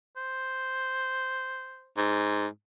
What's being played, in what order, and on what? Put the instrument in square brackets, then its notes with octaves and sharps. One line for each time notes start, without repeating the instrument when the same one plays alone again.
[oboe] C5
[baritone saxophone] G#2